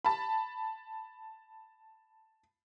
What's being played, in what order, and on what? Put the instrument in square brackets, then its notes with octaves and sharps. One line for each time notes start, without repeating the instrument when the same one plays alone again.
[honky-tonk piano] A5 B5